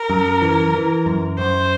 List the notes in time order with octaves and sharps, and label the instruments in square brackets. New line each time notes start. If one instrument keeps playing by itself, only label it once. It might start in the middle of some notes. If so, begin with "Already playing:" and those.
Already playing: [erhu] A#4
[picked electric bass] F#2
E3
E3
F#2
[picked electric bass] F#2 [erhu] C5